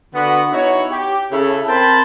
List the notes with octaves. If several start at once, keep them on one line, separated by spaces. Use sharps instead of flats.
D3 B3 F#4
B3 D#4 E4 F#4 C#5
G4
C#3 E4 A4
C4 A#4 G5 A5 B5 C6